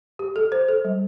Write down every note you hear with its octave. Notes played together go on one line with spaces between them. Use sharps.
G4
A4
C5
A4
G3